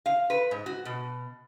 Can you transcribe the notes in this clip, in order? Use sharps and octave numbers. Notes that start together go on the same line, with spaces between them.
F5
B4
G#2
F#4
B2